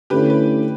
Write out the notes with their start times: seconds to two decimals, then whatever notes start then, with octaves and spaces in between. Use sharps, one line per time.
0.10 D3 A3 C#4 E4 G4 B4
0.30 B4